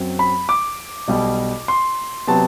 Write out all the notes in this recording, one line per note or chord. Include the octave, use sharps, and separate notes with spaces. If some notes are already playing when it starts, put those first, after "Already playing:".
Already playing: F#2 F#3 C4
B5
D6
B1 B2 G3
C6
C3 F#3 B3 A5